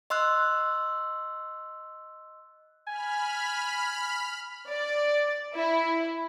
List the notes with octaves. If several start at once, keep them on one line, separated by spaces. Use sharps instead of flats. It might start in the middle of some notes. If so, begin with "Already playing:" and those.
D#5 C6 E6 F#6
G#5 B5 F6
D5
E4